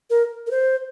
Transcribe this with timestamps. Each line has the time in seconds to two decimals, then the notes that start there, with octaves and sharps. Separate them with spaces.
0.10 A#4
0.46 A#4
0.51 C5